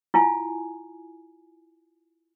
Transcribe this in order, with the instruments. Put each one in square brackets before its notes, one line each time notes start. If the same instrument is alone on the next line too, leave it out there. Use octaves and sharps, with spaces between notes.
[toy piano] E4 F4 G#5